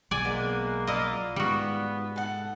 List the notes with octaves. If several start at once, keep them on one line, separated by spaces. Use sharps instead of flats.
B1 D5 G#5
G#3 A#3 B3 D4
E4 F4 D5 D#5 F5
G#2 G3 B3 F#4
A4 F#5